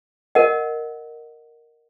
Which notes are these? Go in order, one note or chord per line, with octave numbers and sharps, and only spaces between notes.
A#4 D#5 F#5